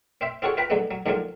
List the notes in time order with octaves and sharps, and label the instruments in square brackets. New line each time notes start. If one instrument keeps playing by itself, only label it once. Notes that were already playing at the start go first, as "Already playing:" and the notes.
[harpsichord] C4 C5 E5
C4 F4 F#4 G#4 A4 C#5
F4 B4 G5 A#5 B5
D3 F#3 G#3 B3
F#3
G#2 D3 D#3 F3 F#3 F4